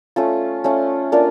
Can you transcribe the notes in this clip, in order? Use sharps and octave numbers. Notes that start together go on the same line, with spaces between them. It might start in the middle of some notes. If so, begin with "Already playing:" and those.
A3 C#4 F4
A3 C#4 F4
A#3 D4 F4 A#4